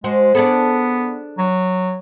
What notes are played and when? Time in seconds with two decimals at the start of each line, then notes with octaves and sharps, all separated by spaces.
0.04 G#3 F#4 C5
0.35 B3 D4 G#4 A4
1.38 F#3